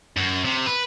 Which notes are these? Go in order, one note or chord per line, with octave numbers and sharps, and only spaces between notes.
F#2
C3
B4